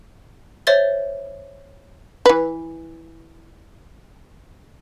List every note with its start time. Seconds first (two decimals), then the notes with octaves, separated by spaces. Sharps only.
0.67 C5 C#5 E5 A6 G7
2.26 E3 B4